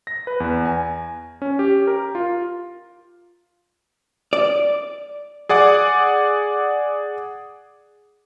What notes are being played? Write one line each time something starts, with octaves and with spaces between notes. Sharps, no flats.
A#6
B4
E2
G#5
C#4
G4
A#4
F4
D5
G#4 D5 F#5 D6